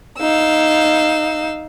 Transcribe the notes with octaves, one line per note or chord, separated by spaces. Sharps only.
D#4 F5 E6